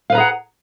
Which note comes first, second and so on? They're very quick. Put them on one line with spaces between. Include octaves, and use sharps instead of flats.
F5 B4 A#5 G#4 F#5